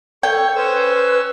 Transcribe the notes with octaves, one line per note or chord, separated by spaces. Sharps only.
A4 C#5 G5
C#4 B4 C5 E6